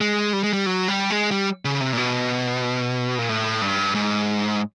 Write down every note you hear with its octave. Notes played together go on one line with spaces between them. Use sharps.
G#3
G3
G#3
G3
F#3
G3
G#3
G3
C#3
C3
A#2
B2
A#2
A2
G2
G#2